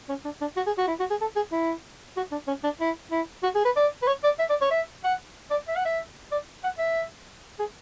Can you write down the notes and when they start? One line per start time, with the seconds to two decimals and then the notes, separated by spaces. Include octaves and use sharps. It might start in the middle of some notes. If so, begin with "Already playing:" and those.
0.09 C#4
0.25 D4
0.41 D4
0.57 F#4
0.67 G#4
0.78 F#4
0.88 E4
1.00 F#4
1.10 G#4
1.21 A4
1.36 G#4
1.52 E4
2.17 F#4
2.32 D4
2.47 C#4
2.64 D4
2.80 E4
3.11 E4
3.43 F#4
3.55 G#4
3.65 B4
3.76 D5
4.02 B4
4.07 C#5
4.24 D5
4.39 E5
4.50 D5
4.61 C#5
4.71 E5
5.04 F#5
5.51 D5
5.68 E5
5.76 F#5
5.85 E5
6.32 D5
6.64 F#5
6.79 E5
7.59 G#4